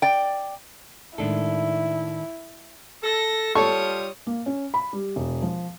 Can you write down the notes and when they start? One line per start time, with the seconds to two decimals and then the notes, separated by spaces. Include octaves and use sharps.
0.02 D5 G5
1.18 A2 D#3 G#3 D4 E4 A4
3.03 A4 A#6
3.55 G3 F4 A4 C#5 C#6 D#6
4.27 A#3
4.46 C#4
4.74 B5
4.93 G3
5.16 E1
5.42 F3